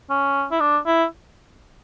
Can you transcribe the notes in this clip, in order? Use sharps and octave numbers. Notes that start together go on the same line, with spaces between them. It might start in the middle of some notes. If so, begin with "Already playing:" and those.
C#4
E4
D4
E4